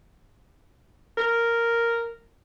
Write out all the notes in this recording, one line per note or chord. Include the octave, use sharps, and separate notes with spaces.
A#4